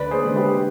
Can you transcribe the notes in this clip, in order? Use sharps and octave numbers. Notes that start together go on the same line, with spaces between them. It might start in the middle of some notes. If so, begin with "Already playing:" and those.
Already playing: D2 B4 D5
G#4 C5
D3 G#3
G4 B4